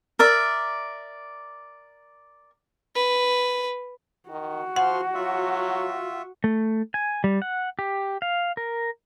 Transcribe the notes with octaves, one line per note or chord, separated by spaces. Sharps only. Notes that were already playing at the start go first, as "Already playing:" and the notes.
A#4 D5 E5
B4
D#3 F#4
F3 C5 F#5 C6 F6
F#3 F4 E5
A3
G#5
G3
F#5
G4
F5
A#4